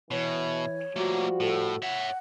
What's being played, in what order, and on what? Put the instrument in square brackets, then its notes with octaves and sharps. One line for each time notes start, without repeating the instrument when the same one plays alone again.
[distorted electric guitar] B2 [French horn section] E3 [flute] C#5
[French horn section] F3 G3 F#4 [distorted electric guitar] A3 A#3
[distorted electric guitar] A2 [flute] A4
[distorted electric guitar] C#5 E5 [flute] F#5